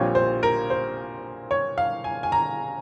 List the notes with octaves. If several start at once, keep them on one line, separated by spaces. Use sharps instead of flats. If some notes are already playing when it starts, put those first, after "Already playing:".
Already playing: A#1 A#2 G3 C4 F4 C#5
C5
A#4
C5
C#5
F5
G#5
G#5
A#5